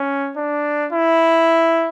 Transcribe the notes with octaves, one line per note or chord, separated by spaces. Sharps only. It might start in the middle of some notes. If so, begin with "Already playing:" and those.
Already playing: C#4
D4
E4